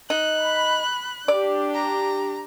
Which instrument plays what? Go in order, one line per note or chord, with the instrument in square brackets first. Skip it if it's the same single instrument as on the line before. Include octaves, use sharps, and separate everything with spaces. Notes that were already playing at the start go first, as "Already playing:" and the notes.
[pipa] D#4 [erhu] F#6
[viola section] B5
[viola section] D4 G4 [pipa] D5
[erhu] A#5